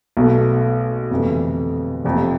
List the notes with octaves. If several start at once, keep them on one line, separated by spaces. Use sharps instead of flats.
B1 B2 A3
G1 F2 C3 E3 A3
F1 F2 C3